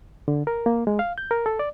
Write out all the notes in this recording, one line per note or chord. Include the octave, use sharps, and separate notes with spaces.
D3
A#4
A#3
G#3
F5
G6
A#4
A4
D5